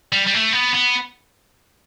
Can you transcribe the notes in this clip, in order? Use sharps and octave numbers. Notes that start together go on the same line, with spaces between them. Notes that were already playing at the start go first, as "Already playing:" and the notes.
G3
G3
A3
B3
B3